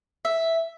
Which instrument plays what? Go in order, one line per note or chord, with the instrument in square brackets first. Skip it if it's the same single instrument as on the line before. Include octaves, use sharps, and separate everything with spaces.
[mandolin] E5